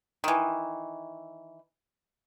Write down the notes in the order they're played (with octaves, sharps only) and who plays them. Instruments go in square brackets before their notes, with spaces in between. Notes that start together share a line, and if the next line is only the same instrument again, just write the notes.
[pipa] D#3 E3